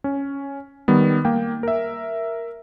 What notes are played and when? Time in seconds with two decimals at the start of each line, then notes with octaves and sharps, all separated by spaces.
0.04 C#4
0.88 D#3 G3 B3
1.25 A#3 G5
1.63 A#4 E5